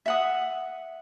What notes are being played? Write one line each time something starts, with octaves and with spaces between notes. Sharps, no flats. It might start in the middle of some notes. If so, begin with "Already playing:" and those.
E5 F#5 D#6